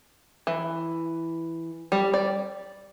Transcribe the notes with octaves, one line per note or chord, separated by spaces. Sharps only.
E3
G3
D5